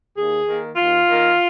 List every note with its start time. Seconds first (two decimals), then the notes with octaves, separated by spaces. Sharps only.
0.17 D#2 G#4
0.47 D#3 A#3
0.76 D#2 F4
1.07 D#3 A#3